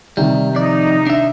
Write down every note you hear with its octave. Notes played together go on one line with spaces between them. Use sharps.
C3 D#3 G3
F2 D#4 D5
D4 E5